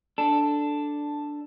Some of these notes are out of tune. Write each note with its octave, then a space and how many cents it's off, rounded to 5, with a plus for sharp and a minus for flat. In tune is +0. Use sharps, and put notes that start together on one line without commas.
D4 +0 A4 +0